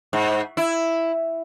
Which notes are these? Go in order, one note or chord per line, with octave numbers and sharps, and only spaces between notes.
G#2
E4